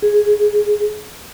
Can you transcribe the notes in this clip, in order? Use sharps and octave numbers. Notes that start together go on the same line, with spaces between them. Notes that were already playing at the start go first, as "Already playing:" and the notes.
G#4